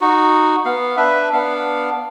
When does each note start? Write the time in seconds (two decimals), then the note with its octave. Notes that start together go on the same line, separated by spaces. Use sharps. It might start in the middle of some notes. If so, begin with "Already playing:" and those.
0.01 D#4 F#4
0.65 B3 F5
0.97 D4 B4 E5
1.33 B3 D4 F5